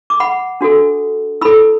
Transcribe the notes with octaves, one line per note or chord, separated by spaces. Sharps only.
D6
F#5 B5
D4 F#4 A4
E4 A4 B5 E6